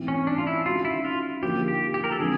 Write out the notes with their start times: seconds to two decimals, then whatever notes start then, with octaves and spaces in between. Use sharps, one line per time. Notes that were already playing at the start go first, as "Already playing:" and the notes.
Already playing: G#2 E3 A3 C4
0.08 C#4
0.27 D4
0.38 F4
0.47 E4
0.66 D#3 G#3 C#4 F4 F#4
0.85 E4
1.05 F4
1.42 D3 F3 A#3 D#4 F#4 G4
1.68 G4
1.94 G4
2.04 A#4
2.12 A4
2.20 D3 F3 G#3 C4 G#4